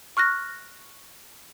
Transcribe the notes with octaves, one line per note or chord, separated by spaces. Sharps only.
C#6 F6 F#6 A#6